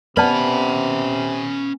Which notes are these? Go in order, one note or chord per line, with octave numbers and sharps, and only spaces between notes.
C3 B3 C#4 B4 D5 A5 B5